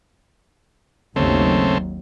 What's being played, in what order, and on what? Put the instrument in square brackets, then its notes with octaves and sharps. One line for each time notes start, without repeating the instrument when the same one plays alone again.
[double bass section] G#1 D#2 F#3 [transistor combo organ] C#3 A3 C4